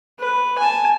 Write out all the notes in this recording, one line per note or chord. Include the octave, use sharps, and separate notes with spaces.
B4
G#5 A5